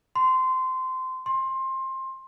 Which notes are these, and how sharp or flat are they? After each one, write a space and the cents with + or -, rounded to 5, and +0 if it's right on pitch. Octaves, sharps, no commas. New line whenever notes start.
C6 -20
C6 +20